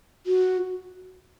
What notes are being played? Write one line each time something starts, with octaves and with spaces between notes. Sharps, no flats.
F#4